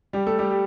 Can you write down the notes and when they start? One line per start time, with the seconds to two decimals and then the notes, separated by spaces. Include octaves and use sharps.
0.13 G3 G4
0.26 A3 A4
0.39 G3 G4
0.51 G4